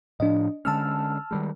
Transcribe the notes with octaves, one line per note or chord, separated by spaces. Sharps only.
A2 F3 D4 D#5
D3 G#3 C#4 A5 E6 F6
D#3 G3 G#3